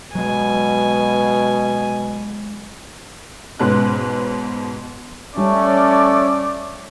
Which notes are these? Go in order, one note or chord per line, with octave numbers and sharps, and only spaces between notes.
B2 F#3 G#3 G#5
G#2 B2 C#4 B4 F#6
G3 A3 C#4 D5